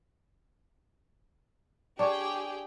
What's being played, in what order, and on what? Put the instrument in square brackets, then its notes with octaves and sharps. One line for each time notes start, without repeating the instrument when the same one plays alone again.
[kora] D4 C#5 [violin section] G4 G#4 G5